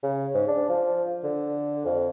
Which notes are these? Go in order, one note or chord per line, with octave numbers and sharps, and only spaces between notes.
C#3
G#2
D4
F3
D3
F2